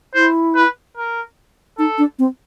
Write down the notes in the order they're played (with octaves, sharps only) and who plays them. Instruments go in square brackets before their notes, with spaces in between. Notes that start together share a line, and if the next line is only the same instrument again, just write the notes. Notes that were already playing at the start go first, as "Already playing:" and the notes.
[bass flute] E4 [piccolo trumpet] C5
[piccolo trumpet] B4
A#4
[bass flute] D#4 [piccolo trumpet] A4
[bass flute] D4
C4